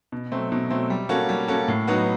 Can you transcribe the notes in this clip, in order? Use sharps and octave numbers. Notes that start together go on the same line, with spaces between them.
B2
F#3 A3 C4
B2
F#3 A3 C4
G3
A#3 C#4 F#4 A4
G3
A#3 C#4 F#4 A4
A2
F#3 B3 D#4 F#4